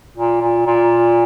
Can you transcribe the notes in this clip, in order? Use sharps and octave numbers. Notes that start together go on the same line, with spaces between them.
A#2
A#2
A#2